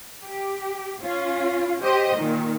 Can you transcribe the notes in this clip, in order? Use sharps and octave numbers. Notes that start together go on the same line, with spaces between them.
G4
C#4 F4
G4 C5 D#5
A#2 D#3